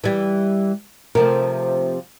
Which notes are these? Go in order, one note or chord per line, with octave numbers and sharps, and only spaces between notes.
E3 G3
C3 F3 A3 A#4